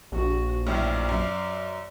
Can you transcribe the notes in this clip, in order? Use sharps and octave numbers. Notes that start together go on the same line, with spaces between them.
A#1 F#4
A1 F#2 A2 D5 F5
F#2